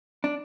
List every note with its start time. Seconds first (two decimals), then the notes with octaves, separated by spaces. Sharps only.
0.24 D4